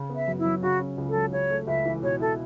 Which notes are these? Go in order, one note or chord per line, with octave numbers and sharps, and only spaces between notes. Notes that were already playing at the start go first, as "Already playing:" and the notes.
Already playing: C#3
B3
E5
F#2
E4
F#3
C#3 F#4
C#4
C#2
A4
F#3
C#3 C#5
A3
C#2 E5
E3
B2 C#5
E4 A4